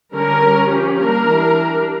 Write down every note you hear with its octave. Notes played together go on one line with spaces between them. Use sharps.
D3 G3 C#4 A#4
G3 C#4
F3 C#4 G4
G3 A#3 D4 A#4
E3 G3 D4
G3 D4